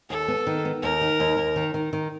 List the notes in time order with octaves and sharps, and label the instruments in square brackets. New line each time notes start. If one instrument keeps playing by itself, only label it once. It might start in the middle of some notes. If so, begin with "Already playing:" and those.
[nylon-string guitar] D#2 [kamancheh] A4
[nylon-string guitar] B3
D#3
B3
[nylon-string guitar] D#2 [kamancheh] A#4
[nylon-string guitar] D#3
D#2
D#2
D#3
D#3
D#3